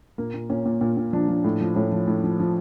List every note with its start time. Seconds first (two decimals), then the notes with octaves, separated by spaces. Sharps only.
0.18 A#2 A#3
0.34 A#2
0.50 A#2 C#4
0.66 A#2
0.81 A#2
0.97 A#2
1.13 F3 D4
1.29 F3
1.44 A2
1.60 F3
1.76 A2 C#4
1.92 F3
2.08 A2
2.24 F3
2.40 F3